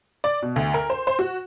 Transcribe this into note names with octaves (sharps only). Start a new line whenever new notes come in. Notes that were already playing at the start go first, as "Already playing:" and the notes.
D5
B2
D2
A#4
C5
C5
F#4